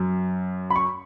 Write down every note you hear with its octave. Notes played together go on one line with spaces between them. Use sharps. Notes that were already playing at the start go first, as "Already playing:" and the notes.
Already playing: F#2
B5
C#6